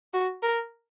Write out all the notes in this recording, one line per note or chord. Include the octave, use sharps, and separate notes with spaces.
F#4
A#4